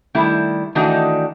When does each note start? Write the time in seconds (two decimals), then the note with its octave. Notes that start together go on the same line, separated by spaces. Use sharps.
0.15 D#3 G3 A3 E4
0.75 D#3 E3 A3 D4 D#4 F#4